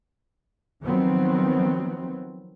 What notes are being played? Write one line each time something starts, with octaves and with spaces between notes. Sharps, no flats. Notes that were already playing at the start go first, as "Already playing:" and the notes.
D#3 F3 F#3 B3 C4